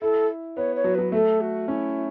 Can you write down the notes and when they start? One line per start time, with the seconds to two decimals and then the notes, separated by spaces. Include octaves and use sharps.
0.01 E4 A4
0.56 B3 C#5
0.75 C#5
0.84 F#3
0.94 F#3 B4
1.12 A3 A4
1.40 F#4
1.68 C#4 E4